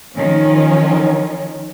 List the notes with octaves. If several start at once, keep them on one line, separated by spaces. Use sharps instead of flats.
D#3 F3 C#4